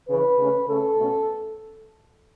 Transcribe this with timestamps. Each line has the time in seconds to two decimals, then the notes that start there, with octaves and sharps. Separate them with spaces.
0.09 C#3 E3 C#4 B4
0.38 C#3 A3 C#4
0.68 C#3 A3 C#4 A4
0.98 B2 A3 C#4